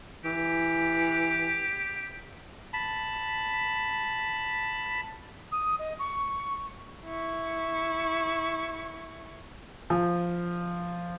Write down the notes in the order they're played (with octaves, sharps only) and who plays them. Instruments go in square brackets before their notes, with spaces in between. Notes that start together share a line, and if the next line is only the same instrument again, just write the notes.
[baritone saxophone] E3 [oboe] G4
[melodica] A5 B5
[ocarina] D#6
D#5
C#6
[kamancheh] E4 C#6
[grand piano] F3